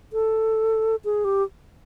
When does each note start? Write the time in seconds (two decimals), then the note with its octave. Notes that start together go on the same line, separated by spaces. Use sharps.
0.13 A4
1.05 G#4
1.25 G4